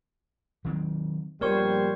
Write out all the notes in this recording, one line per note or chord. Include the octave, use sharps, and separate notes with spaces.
D#3 F#3 C4
A#1 G3 B3 A#4 C5 C#5 C#6